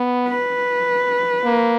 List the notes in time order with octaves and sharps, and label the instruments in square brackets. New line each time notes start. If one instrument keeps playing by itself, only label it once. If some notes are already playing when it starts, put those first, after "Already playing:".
Already playing: [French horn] B3
[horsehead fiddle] B4
[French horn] A#3